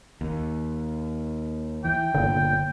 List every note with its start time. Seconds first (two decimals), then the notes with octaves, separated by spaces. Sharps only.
0.21 D#2
1.84 E3 G5
2.15 G1 A#2 D3